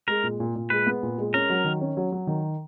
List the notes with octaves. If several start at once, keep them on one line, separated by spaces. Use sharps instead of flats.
G#3 A#4
A#2
A#2
A#2
G#3 B4
B3
A#2
G#3
C#4 A#4
F#3
D#3
C#4
F#3
F#3
D#3